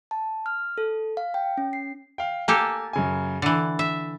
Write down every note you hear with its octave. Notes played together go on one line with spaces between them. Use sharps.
A5
F6
A4
F5
G5
C#4
C7
F5 G5
A#3 G4 A4 G#5
F#2 C#3 G#5
D3 E3 A6
E5